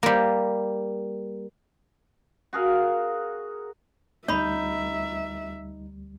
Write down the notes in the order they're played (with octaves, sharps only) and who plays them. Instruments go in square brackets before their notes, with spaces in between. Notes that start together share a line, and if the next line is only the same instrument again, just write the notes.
[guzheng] G3 A#3
[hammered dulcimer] F#4 G#4 A#4 F5
[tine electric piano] D2 G3 [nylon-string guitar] D#4 [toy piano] C#5 B5 [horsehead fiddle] E5